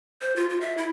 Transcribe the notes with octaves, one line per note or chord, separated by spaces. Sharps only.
C5
F4
F4
E5
E4